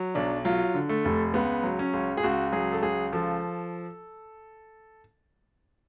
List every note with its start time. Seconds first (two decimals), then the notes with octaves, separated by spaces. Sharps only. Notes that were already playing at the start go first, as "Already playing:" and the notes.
Already playing: F#3
0.15 B1 D4
0.45 F#3 F4
0.74 D3
0.89 A3
1.05 F1
1.34 C#2 B3
1.64 F#3
1.79 C#4
1.93 C#2
2.17 G#4
2.23 C#2 F#4
2.52 F#3 G#4
2.72 A4
2.82 C#2 G#4
3.12 F3 A4